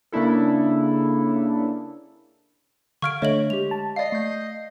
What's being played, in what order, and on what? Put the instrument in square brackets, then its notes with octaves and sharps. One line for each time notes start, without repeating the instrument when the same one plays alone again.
[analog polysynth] C#3 A#3 D4 E4 A4
[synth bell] D3 F5 G#6 [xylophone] C#6 F6 D7
[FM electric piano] D3 A3 [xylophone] C#5 D#5 F#7 [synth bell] E5
[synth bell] G#3 G4 [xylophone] F7
[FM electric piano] A5
[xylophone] D5 F5 [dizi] D#5 [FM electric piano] C7
[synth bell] A3 G6